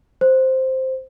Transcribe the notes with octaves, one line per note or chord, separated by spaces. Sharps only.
C5